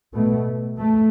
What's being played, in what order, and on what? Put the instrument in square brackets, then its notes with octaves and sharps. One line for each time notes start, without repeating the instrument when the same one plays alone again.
[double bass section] B2 A3
A3